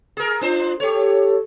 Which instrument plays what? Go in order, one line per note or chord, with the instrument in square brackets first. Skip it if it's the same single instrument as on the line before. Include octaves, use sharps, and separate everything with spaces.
[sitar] G#4 A#4
[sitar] D4 C5 [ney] F4
[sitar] G4 C#5 [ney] A4